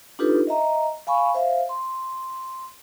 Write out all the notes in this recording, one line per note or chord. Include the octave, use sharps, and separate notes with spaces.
D4 D#4 F4 G4 A4 B4
D#5 E5 A#5
F5 G#5 B5 C#6
C5 E5 F5
C6